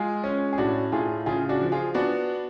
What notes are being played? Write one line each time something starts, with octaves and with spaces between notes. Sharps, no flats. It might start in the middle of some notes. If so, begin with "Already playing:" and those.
Already playing: G#3 F4 G#4
C#4
G#4
A2 D4 F#4
A2 F4 G#4
C#3 F4 G#4
D4 F#4
F3
F4 G#4
B3 D4 F#4